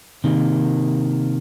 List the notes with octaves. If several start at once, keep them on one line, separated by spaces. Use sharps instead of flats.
C3 D#3 A#3